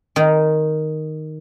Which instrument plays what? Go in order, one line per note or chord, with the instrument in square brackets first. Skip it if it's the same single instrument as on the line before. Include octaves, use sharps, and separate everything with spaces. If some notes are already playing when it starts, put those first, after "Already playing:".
[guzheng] D#3